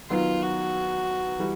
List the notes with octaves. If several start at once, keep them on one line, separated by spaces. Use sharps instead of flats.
D#3 F#3 B3 F4
F#4
E3 G3